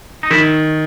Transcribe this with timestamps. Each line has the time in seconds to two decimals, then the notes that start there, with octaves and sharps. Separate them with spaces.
0.23 D#4
0.31 D#3 E4